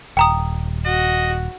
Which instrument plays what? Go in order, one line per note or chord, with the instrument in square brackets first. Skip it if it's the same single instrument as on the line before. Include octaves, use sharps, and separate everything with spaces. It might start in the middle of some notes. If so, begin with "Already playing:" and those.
[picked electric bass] D#1 [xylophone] G5 A#5 D#6
[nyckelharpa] F#4 [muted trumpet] D#5